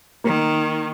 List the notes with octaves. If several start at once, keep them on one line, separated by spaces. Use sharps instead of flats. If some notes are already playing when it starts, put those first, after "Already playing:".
D#3 A#3